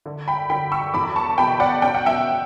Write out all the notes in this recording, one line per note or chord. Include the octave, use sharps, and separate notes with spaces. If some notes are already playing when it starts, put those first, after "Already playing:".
D3
G5 B5
D3 G5 B5
C#6 E6
E2 B5 D6
A5 C#6
B2 G5 B5
D5 F#5
C#4 G5
F#5
E5 G5